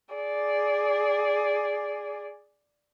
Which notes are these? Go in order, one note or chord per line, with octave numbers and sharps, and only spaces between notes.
G#4 D5